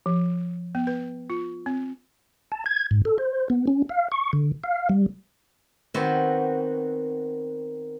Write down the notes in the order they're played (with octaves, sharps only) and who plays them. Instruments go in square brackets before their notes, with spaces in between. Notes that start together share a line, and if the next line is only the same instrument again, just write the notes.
[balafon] F3
B3
B4
F4
C4
[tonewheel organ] A5
G#6
G#2
A4
C5
B3
C#4
F5
C#6
D3
F5
G3
[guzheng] D#3 B3 C4 F#4